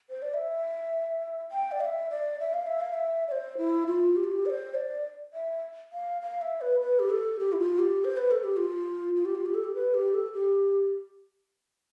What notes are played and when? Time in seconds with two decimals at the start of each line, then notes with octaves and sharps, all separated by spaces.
0.10 C5
0.22 D5
0.34 E5
1.52 G5
1.72 D5
1.81 F5
1.85 E5
2.10 D5
2.40 E5
2.54 F5
2.67 E5
2.81 F5
2.93 E5
3.28 D5
3.32 C5
3.58 E4
3.87 F4
4.16 G4
4.24 F4
4.32 G4
4.46 D5
4.50 C5
4.75 D5
5.34 E5
5.93 F5
6.21 F5
6.42 E5
6.61 B4
6.81 B4
6.99 G4
7.10 A4
7.39 G4
7.53 E4
7.59 F4
7.79 G4
8.05 C5
8.17 B4
8.31 A4
8.44 G4
8.57 F4
9.16 F4
9.25 G4
9.35 F4
9.46 G4
9.54 A4
9.64 G4
9.75 B4
9.94 G4
10.14 A4
10.33 G4